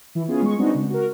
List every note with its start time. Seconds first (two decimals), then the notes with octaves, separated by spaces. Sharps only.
0.15 E3 E4
0.28 B3 C#4 F4 G#4
0.42 G#3 C#6
0.59 G#3 B3 C4 D4 D#4 F#4
0.74 C#3
0.90 F#4 A#4